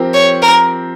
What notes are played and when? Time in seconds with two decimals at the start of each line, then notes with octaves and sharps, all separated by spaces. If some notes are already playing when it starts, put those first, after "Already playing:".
Already playing: F3 C4 G4 A#4
0.14 C#5
0.42 A#4